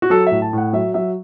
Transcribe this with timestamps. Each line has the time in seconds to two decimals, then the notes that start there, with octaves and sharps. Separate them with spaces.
0.02 F#4
0.10 F#3 A4
0.27 A2 E5
0.42 A5
0.53 A2 F#5
0.73 F#3 E5
0.94 F#3 E5